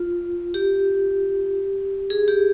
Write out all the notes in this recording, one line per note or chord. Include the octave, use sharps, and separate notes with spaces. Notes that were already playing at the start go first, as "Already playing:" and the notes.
Already playing: F4
G4
G#4
G4